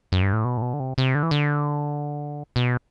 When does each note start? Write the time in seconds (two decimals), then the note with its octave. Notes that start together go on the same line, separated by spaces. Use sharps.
0.12 F#2
0.22 G2
0.33 A2
0.45 B2
0.57 A2
0.62 B2
0.74 D3
0.80 C3
0.98 C3
1.15 D3
1.23 E3
1.31 D3
2.56 B2